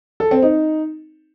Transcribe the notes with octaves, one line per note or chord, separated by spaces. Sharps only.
A4
C4
D#4